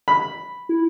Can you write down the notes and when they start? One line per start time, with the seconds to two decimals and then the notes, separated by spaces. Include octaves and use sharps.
0.08 B5
0.69 E4